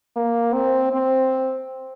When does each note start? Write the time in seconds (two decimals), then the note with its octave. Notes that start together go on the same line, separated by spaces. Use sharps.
0.16 A#3
0.54 C4
0.93 C4